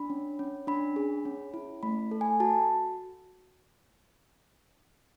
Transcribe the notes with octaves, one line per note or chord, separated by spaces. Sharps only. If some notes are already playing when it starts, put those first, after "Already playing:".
Already playing: D4 B5
C#4
C#4
D4 B5
G#4
C#4
E4
A3 B5
A4
G#5
F#4 A5